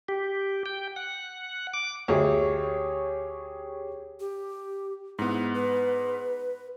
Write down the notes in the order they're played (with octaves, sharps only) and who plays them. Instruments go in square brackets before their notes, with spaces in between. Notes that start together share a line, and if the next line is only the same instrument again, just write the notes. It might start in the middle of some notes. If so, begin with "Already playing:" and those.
[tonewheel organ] G4
G5
F#5
D6
[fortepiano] D2 [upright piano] G4 G#4 C#5
[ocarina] G4
[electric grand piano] G#2 B3 [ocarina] E4
[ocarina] B4